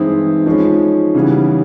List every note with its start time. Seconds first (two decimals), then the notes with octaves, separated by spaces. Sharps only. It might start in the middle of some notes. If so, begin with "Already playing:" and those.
Already playing: G2 E3 G#3 C4 D#4 E4
0.46 F3 G#3 C#4
1.15 C#3 E3 G3 B3